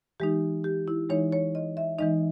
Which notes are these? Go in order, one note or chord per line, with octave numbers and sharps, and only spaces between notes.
E3 G#3 D#4 G4
G4
E4
E3 G#3 D#4 C#5
C#5
D#5
E5
E3 G#3 D#4 D#5